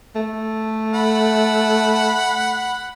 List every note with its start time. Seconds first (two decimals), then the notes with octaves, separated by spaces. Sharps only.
0.15 A3
0.94 F#5 B5